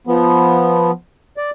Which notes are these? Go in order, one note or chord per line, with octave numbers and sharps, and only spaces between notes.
F3 B3
D5